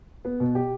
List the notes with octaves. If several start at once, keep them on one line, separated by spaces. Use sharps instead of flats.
B3
B2
G4